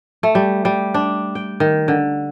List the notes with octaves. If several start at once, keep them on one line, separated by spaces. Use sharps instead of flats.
A3
G3
G3
D4
G5
D#3
D3